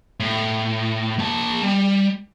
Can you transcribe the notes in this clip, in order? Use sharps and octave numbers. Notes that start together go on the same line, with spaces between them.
A2
A#3 A5
G3